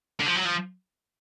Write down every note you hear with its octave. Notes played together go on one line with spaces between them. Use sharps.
D3
F3
F#3
F3